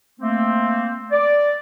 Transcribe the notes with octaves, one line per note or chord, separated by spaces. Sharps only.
A3 A#3 C4
D5